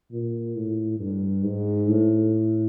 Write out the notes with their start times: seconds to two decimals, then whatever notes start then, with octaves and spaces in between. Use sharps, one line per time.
0.11 A#2
0.55 A2
1.00 G2
1.43 G#2
1.88 A2